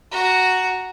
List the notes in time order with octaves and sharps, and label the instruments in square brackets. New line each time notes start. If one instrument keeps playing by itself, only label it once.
[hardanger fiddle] F#4 A#5